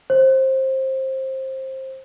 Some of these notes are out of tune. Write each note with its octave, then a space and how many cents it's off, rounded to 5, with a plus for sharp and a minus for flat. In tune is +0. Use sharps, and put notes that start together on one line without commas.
C5 +20